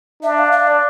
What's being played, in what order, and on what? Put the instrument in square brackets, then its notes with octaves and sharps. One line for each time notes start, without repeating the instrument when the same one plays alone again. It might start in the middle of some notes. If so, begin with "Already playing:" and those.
[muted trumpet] D4 [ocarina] E5
[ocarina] F5
F5
D5